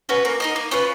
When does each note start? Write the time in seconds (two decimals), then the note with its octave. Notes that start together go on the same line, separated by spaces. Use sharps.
0.09 C#4 F#4 B4
0.25 A#3
0.40 D#4 A#4 D#5
0.56 A#3
0.71 C#4 F4 B4